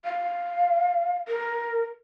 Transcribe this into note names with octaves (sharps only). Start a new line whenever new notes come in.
F5
A#4